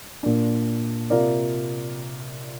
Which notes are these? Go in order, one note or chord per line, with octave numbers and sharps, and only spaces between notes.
A#2 A#3 D4
C3 A#3 F4 A#4 D5